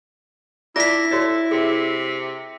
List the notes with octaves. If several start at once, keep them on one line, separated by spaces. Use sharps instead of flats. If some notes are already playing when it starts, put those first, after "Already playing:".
D4 E4 F4 D5 E5 A#6 B6
F#4 A4 C#5 D5
C3 G#4